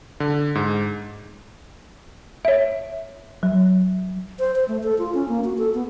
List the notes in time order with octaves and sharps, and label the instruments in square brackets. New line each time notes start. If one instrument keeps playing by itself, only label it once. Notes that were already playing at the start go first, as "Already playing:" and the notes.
[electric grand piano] D3
G#2
[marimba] C#5 E5
F#3
[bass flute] C5
C5
A3
A4
F4
C#4
A#3
F#4
A4
B3